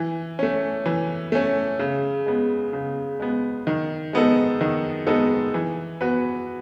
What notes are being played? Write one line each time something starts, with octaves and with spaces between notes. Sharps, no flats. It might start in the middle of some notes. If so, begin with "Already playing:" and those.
Already playing: E3
A3 C#4
E3
A3 C#4
C#3
G#3 B3
C#3
G#3 B3
D#3
G#3 B3 D#4 A4
D#3
G#3 B3 D#4 A4
E3
B3 F#4 B4